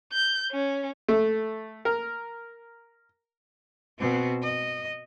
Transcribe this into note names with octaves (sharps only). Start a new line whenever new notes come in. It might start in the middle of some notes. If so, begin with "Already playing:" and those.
G6
C#4
A3
A#4
B2 C4
D#5